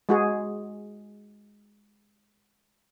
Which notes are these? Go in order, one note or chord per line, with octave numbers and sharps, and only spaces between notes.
G#3 F#4 G#4